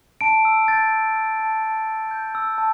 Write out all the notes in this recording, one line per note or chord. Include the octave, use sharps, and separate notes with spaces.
A5 D7
E6
G6 A6
E6
E6
A5
A5
E6
G6
E6
A5